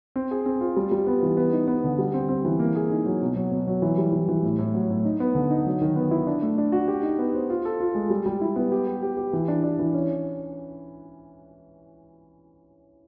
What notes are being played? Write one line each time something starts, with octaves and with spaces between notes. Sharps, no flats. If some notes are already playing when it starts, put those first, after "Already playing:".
C4
G#4
C4
F4
G3
G3
B3
E3
B3
D#4
B3
D3
G3
C4
C4
E3
A#3
G#4
D#4
F#3
B2
F#3
B2
F#3
E3
G3
E3
E3
A2
A2
F#3
A2
D#4
B3
D3
D#4
F#3
D#3
B3
E4
D4
A3
D4
F#4
G4
D#4
B3
C5
F4
A4
F4
G#3
G3
G3
E4
B3
G4
G4
G4
G4
E3
D4
D4
E3
C#4